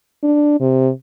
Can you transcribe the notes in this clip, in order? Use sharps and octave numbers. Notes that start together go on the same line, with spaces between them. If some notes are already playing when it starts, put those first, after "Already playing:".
D4
C3